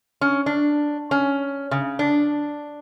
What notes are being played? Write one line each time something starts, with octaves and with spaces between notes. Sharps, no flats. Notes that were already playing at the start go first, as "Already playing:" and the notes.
C#4
D4
C#4
C#3
D4